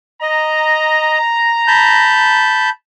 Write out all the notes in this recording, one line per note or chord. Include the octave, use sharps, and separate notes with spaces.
D#5 A#5
A5 B5 G6